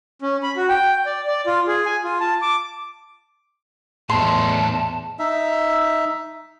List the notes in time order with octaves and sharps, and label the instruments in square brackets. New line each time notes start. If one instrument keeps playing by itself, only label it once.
[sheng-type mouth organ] C#4
B5
F#4
G5
D5
D5
F4
G#4
G#5
F4
A5
D6
[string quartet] E2 [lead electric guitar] A2 D#4 [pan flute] A5 [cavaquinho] C6
[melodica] D#4 E5